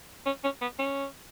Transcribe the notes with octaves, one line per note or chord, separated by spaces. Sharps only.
C#4
C#4
B3
C#4